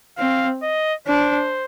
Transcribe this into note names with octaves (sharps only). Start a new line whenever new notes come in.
C4 F5
D#5
D4 C5